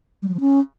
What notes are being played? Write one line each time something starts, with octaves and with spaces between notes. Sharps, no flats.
G3
F#3
F3
C#4